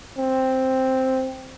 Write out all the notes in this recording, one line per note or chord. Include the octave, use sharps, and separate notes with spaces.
C4